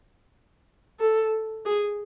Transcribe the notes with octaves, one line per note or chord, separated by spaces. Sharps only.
A4
G#4